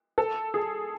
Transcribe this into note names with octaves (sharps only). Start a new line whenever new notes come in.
A4
G#4